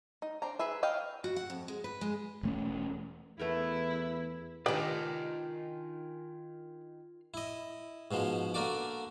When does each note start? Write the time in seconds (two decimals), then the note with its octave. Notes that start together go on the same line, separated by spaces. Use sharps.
0.22 D#4
0.42 C4 D4 A#5
0.59 G#4 B4 E5
0.83 D#5 F5 G5
1.24 F#4
1.36 F#5
1.50 F2
1.68 G#3
1.84 B4
2.01 G#3
2.43 E1 A3 C#4
3.39 E2 A3 B3 E4 A#4
4.66 D#3 D4 F4 G4 B4 G#5
7.34 E4 D#5
8.11 G#2 B2 F3 G#3
8.54 D3 A#3 F#4 D5 D6